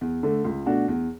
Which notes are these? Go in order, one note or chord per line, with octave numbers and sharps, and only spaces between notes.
E2
D3 A3
C#2
B2 A3 D4 F#4
E2